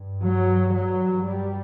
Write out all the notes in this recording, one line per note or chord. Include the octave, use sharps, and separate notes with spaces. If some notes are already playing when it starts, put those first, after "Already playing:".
Already playing: G2
F#3
F#3
G3